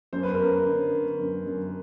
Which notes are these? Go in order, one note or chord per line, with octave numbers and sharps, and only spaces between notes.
F#2 C5
B4
A#4
F#2 B4
D3
D3
F#2
F#2